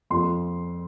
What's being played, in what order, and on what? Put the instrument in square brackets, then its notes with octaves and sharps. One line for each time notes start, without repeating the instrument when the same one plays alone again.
[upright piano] F2 F3 C6